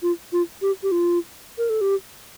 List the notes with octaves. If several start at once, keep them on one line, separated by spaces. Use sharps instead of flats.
F4
F4
G4
G4
F4
A#4
A4
G4